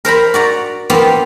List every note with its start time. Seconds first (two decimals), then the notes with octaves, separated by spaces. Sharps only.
0.05 A#4 C5 A#5 B5
0.34 F#4 D5 A#5
0.90 A#3 B3 F4 G4 C5 F5